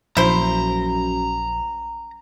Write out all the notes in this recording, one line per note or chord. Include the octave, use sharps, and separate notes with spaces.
A#1 F#2 E4 C5 A#5